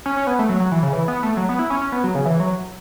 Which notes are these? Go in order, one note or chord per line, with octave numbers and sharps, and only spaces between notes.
C#4
C#4
B3
A3
F#3
F#3
E3
C#3
E3
B3
A3
F#3
B3
E4
C#4
C#4
B3
F#3
C#3
E3
F#3